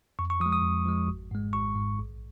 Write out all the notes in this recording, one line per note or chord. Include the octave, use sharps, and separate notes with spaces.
F2 C#6
C#6
F3 D#6
G#3
D#6
F2
F3 G#3
G#1
G#2 G#3
G#1 C#6
G#2 G#3
A#1